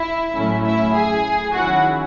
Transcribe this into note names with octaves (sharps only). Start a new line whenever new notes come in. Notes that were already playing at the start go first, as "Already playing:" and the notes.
Already playing: E4 E5
A2 F#3 A3 C#4 E4
E4 E5
G#4 G#5
D#3 F#3 C#4 E4 F#4 F#5